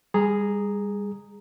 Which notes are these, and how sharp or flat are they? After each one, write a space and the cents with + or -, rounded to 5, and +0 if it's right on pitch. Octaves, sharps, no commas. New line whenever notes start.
G3 +35 G#4 +0 A#5 -5